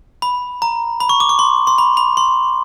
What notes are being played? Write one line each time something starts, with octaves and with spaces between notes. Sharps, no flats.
B5
A#5
B5
C#6
D6
C#6
C6
C6
B5
B5
C6